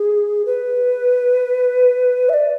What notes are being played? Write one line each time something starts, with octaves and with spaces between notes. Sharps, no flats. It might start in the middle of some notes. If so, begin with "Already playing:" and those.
Already playing: G#4
B4
E5
D5